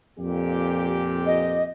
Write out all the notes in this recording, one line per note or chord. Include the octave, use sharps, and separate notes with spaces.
F2 A#2 G4
D#5